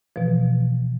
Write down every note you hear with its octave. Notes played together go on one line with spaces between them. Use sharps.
B2 E3 F3